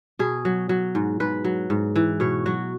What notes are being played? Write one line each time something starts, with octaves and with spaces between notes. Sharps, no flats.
B2 G#4
F#3
F#3
G#2
G#2 B4
F#3
G#2
E3
B2 C#5
F#3 F#4